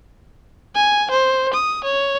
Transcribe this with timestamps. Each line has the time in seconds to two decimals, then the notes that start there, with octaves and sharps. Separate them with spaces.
0.75 G#5
1.11 C5
1.54 D#6
1.84 C#5